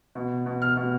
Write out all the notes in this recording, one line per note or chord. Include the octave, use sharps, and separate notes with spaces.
B2
B2
F6
B2